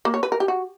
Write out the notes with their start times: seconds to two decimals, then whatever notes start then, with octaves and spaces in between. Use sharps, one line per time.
0.05 A#3
0.14 C#5
0.23 B4
0.32 A#4
0.40 G4
0.48 F#4